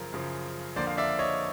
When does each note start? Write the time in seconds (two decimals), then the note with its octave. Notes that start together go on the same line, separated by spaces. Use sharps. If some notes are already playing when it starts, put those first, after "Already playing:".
Already playing: F#2 C#3 F3 A#4
0.13 F#2 C#3 F3
0.76 F2 D3 F3 A#3 C5 D5
0.87 F5
0.97 D5 E5
1.19 C#5 D#5